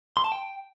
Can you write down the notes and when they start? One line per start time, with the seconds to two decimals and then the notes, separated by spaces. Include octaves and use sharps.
0.17 C6
0.24 A5
0.32 G5